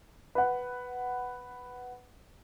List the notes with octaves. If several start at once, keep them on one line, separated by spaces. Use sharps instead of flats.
B4 F#5